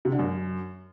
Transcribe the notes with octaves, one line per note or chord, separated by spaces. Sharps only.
C3
D3
F#2